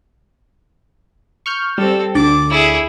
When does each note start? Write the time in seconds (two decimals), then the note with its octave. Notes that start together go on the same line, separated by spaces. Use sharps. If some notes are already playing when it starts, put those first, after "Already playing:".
1.46 C#6 F6 G6
1.78 G3 C4 A4
2.15 D2 D3 D5 D6
2.50 E4 G#4